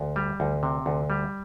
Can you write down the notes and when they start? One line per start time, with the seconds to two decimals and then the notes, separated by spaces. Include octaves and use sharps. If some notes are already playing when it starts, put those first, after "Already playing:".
Already playing: D2
0.16 G3
0.40 D2
0.63 C3
0.86 D2
1.10 G3